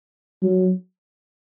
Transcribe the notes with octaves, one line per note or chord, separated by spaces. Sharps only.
F#3